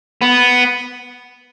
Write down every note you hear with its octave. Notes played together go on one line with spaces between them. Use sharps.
B3